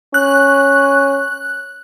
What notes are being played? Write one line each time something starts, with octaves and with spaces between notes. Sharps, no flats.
C#4 F#6